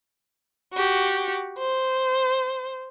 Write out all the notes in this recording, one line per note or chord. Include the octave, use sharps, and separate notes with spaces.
F#4 G4
C5